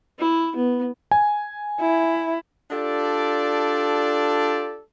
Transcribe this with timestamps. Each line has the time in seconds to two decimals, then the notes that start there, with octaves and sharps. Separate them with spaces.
0.19 E4
0.55 B3
1.11 G#5
1.80 E4
2.71 D4 F4 G4 A4 D5